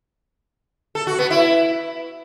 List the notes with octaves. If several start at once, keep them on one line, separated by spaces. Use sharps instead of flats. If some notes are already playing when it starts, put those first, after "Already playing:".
A4
F#4
B3
E4